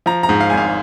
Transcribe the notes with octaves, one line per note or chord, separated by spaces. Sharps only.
F3 A#5
A#5
G#2
F5
G#1 G#5
F5